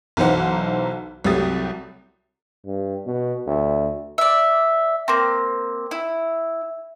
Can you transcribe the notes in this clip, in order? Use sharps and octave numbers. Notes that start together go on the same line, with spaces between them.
B1 E3 F#3 D#4 C5 F#5
C2 F#3 A3 G4 D#6 A6
G2
B2
D2
D5 E5
A#3 C4
E4